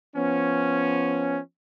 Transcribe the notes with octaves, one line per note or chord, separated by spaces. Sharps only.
F3 B3 C#4